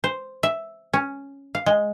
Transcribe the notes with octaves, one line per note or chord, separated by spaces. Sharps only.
C5
E5
C#4
F5
G#3